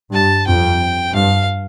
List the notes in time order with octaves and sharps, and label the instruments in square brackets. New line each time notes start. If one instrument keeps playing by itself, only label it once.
[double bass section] G2 [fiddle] A5
[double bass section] F2 [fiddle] G5
[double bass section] G2 [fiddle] F5